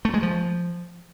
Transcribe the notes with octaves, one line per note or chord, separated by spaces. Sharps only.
A3
G#3
F3